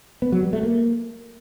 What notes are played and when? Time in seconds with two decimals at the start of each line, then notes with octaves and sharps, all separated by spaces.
0.22 B3
0.32 F#3
0.43 G3
0.53 A3
0.63 A#3